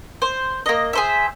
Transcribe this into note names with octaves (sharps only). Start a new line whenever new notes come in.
C5
A#3 D#5
G#4 C5 E5